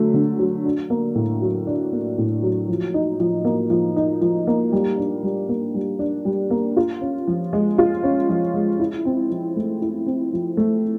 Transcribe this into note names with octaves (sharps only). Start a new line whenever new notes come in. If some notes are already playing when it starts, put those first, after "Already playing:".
Already playing: D3 F#3 A3
D3
F#3
D4
A#3
A2
F#3
D4
A#3
A2
F#3
F3
D#4
F3
A#3
F3
D#4
F3
A#3
G3
D4
G3
A#3
G3
D4
G3
A#3
F4
C#4
F3
G#3
F4
C#4
F3
G#3
E4
C4
F3
A3
E4
C4
F3
A3